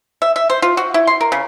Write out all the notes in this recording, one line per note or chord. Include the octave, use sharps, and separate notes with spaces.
E5
E5
C5
F4
F#4
E4
C6
A#4
C#3